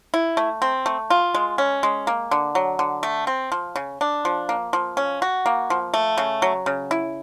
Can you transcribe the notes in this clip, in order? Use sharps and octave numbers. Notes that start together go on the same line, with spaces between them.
E4
A3
C4
A3
F4
G#3
C#4
G#3
A#3
D3
F#3
D3
A3
C4
F3
C#3
D4
F3
A#3
F3
C#4
F#4
A#3
F3
A3
C#3
F#3
C#3
E4